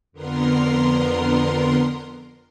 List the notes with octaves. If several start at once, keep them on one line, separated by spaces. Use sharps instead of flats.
F2 D3 B3 A#4 A#5 C6